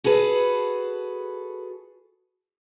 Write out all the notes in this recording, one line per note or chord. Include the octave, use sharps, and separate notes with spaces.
F#4 G#4 A4 B4